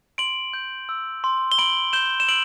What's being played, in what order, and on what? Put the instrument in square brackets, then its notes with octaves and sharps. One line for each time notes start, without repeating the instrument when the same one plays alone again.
[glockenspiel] C6 D7 F#7
G6
E6
C6
G7
B5 D7 F#7
G6 E7 G7
E7
E6 D7 F#7